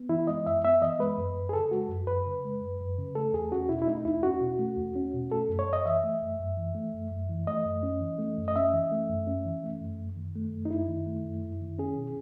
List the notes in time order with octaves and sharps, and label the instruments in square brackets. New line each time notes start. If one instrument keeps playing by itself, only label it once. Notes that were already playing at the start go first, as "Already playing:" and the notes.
Already playing: [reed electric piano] B3
E3 E4
G#3 D#5
F#2 E5
B3 E5
E3 D#5
G#3 B4
F#2
F#2
G#4
C#3 A4
G#3 F#4
F#2
F#2 B4
C#3
G#3
F#2
F#2
C#3
A3 A4
E2 G#4
C#4 F#4
B2 E4
E4
A3 D#4
E2 E4
C#4 F#4
B2
A3
E2
C#4
B2
A3 A4
F#2
C#5
F#2
D#5
E3 E5
A3
F#2
F#2
E3
A3
F#2
F#2
E3
A3 D#5
F#2
C#4
E3
A3
F#2
D#5
C#4 E5
E3
A3
F#2
C#4
E3
A3
F#2
F#2
D#3
A3
F#2
D#4
F#2 E4
D#3
A3
F#2
F#2
D#3
C#4 G#4
B2